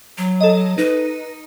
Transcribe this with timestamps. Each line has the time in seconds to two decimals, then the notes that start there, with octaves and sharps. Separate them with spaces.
0.18 F#3
0.41 A4 D#5
0.78 D#4 B4